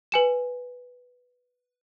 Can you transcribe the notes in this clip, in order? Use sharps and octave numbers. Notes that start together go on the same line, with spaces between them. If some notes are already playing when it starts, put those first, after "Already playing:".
B4 G#5 E7